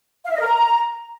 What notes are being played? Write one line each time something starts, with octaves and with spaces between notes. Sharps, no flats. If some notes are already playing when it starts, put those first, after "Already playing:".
F5
E5
D#5
A#4
A#5